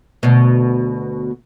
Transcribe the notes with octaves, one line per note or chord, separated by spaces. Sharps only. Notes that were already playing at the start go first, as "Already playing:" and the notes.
D2 B2